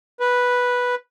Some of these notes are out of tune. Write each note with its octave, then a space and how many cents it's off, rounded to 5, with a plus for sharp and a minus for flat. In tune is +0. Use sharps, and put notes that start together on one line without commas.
B4 -5